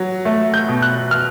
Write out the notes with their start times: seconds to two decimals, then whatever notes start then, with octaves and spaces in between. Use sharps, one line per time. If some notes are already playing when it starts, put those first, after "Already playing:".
Already playing: F#3
0.25 A3
0.54 G6
0.68 B2
0.82 F#6
1.11 F6